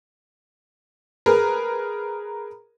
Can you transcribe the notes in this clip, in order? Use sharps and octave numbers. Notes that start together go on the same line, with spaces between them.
G#4 A#4 B4